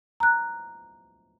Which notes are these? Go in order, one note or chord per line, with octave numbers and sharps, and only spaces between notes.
A#5 F#6